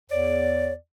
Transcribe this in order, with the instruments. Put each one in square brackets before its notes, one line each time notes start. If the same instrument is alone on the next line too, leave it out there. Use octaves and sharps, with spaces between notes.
[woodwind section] E2 D5 [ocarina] C#5